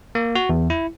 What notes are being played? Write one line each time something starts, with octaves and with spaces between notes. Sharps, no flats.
A#3
F#4
E2
E4